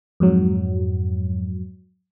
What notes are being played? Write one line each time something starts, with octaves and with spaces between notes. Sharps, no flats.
F2 G#2 F#3